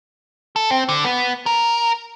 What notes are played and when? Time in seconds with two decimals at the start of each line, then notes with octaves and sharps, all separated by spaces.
0.56 A4
0.71 C4
0.89 D3
1.04 B3
1.46 A#4